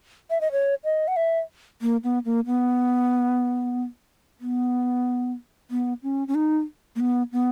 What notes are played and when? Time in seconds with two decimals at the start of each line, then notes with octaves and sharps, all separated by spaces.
0.30 E5
0.41 D#5
0.52 C#5
0.84 D#5
1.08 F#5
1.16 E5
1.82 A#3
2.04 B3
2.25 A#3
2.46 B3
4.41 B3
5.71 B3
6.03 C#4
6.28 C#4
6.35 D#4
6.96 A#3
7.00 B3
7.33 B3